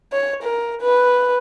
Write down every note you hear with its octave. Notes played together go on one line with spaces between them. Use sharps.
C#5
A#4
B4